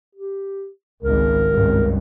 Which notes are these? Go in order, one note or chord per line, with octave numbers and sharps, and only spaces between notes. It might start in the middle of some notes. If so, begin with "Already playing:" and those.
G4
G#1 C#2 A#4
G#1 C#2 G2